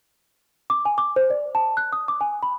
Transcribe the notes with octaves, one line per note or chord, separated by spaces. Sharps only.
D6
G#5
D6
C5
D5
A5
F#6
D#6
D6
G#5
B5